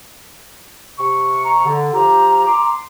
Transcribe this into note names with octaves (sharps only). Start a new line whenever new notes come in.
C3 C#6
A#5
D3
F3 F4 G4 A#5
C6 D6